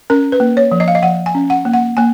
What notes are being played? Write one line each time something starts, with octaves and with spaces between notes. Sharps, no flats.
C#4 A#4
B4
A#3
C#5
F3
D#5
F5
D#5
F3 F#5
G#5
C#4
F#5
A#3
F#5
A#3 G#5